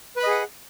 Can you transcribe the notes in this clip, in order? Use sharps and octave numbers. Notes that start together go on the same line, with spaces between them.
G#4 B4 D#5 F#5 B5